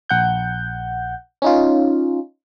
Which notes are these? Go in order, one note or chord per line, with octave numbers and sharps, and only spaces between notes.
A#1 F#5 G6
C#4 D#4 F4